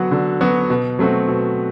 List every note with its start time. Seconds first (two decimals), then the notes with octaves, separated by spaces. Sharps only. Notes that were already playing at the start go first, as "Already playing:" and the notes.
Already playing: D3 F#3 B3 F#4
0.11 D3
0.41 F#3 B3 F#4
0.70 B2
0.99 F#3 A3 C4 F#4
1.28 B2